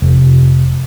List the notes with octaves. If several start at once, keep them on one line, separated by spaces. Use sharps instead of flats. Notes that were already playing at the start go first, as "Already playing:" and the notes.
F1